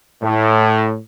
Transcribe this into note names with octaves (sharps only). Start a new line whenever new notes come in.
A2